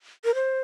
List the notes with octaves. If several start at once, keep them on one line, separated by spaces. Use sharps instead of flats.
A#4
C5